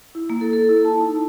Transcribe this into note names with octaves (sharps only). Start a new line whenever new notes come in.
E4
A#3
A4
A4
E4
A5
D#4
E4